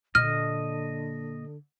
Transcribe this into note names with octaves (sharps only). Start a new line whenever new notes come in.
A#2 D3 A#3 D#5 F6